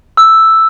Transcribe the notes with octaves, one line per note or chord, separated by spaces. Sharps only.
E6